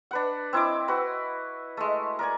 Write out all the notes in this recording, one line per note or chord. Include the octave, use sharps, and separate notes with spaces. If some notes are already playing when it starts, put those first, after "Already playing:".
D4 B4 F#5
C4 E4 D#5 D6
F#4 B4
G#3 A3
A#4 D5 G#5